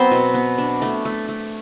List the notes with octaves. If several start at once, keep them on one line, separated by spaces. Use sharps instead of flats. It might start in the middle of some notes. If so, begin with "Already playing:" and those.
Already playing: F#3 B3 C4 C5
B2
B3
D4
A3
A3
A3